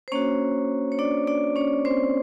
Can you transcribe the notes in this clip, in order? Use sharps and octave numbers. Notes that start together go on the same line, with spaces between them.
C5
A#3 C#4 D4 F#4 C#5
C#5
D4 D5
D4 D5
C#4 C#5
C4 C5